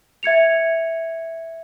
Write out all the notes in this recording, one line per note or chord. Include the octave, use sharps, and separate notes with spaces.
E5 G#6 C#7 F7